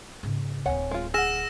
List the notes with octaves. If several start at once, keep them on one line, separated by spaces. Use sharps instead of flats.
G#2 C#3
D1 C4 C#5 F#5 G#5
G#3 F4
G#4 F#5 E6 F6 A#6 E7